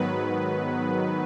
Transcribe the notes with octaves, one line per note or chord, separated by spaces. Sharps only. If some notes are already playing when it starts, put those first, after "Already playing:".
Already playing: G#2 D#3 F#3 B3 B4